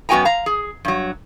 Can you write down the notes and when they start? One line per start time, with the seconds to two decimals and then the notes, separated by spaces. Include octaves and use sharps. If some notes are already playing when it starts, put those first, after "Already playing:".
0.09 F#2 B3 F#4 G5 G#5 A#5
0.25 F5 A#5
0.46 G#4
0.85 G2 F#3